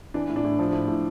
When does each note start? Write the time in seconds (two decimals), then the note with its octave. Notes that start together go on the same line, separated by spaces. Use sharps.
0.14 E3 D4
0.29 A2
0.36 D4
0.45 A2
0.59 F3
0.73 A2
0.88 A2